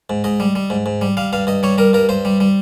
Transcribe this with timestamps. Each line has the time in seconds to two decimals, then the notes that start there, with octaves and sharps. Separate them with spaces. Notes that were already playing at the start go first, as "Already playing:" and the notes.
0.10 G#2
0.24 G#2 D#5
0.40 G3
0.55 G3
0.70 G#2
0.86 G#2
1.01 G3
1.17 G3 F5
1.33 G2 F5
1.47 G2 D#5
1.63 G3 C#5
1.78 G3 A#4
1.93 G2 A#4
2.09 G2 C5
2.25 G3
2.40 G3